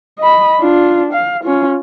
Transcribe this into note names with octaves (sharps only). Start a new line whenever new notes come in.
D#5 B5
D4 F4
F5
C#4 F4